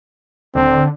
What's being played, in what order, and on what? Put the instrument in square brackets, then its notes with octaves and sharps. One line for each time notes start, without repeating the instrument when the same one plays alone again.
[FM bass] D#1 [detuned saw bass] D3 [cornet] C4